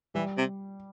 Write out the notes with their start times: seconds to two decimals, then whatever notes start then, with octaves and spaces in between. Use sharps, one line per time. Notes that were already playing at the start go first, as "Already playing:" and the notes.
0.15 E3 G3
0.38 C3